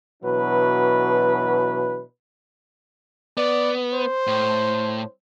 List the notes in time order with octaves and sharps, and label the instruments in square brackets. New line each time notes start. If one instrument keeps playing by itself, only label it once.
[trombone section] B2 E3 F#3 D4 B4
[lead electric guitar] B3 [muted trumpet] D5
[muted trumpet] C5
[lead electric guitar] A2